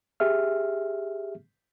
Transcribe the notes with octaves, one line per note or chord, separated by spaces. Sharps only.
G4 G#4 E5 F6